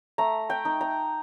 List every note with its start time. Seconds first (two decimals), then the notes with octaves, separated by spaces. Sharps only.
0.18 A3 A#5
0.50 G5
0.65 D#4
0.81 A#5